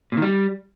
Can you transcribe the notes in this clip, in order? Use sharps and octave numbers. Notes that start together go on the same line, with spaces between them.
A#2
D#3
G3